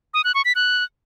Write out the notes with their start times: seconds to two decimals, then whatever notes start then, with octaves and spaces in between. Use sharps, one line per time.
0.14 D#6
0.24 F#6
0.35 C#6
0.45 B6
0.55 F#6